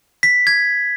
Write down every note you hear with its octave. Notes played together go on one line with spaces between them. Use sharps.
B6
G#6